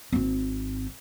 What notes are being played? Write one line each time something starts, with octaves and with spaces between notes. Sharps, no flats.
G#1 C4